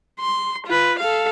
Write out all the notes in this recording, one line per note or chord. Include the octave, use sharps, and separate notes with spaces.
C6
F4 B4
A4 F5